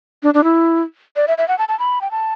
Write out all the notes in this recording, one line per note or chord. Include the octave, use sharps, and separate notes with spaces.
D4
D4
E4
D5
E5
E5
F#5
A5
A5
B5
G5
A5